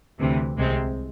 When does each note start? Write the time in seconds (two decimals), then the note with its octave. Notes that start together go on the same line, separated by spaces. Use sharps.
0.19 D2 C3 E3
0.56 C2 C3 G#3 C4